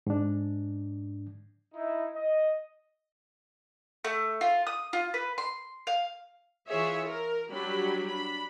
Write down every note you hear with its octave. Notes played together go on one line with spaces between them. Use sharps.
G#2 D4
D#4 E4
D#5
A3
F4
D#6
F4
B4
C6
F5
E3 F4 G#4 C#5 E5
A#4
F#3 G3 D4 G4 B5
D4 B5